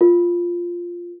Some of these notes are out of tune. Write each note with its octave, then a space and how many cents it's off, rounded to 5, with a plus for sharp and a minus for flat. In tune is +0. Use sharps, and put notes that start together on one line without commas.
F4 +0 A#4 -10